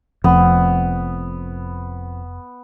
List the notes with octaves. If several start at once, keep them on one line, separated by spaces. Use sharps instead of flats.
F1 F2 B3